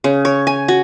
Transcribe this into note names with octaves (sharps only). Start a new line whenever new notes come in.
C#3
C#5
G#5
F#4